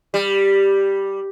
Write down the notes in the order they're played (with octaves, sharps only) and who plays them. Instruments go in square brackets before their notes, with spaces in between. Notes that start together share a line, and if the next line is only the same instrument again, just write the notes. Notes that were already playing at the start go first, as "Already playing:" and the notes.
[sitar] G3